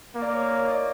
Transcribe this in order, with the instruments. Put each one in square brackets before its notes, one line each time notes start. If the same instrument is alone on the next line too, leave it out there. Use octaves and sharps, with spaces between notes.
[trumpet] A#3
[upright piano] D5
C#5
C#5
D#5
D5